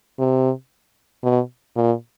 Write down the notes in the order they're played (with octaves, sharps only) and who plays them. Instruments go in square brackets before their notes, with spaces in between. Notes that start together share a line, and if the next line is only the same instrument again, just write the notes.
[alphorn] C3
B2
A#2